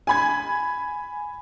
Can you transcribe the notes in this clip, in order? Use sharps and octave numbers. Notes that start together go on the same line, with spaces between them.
G#5 B5 G#6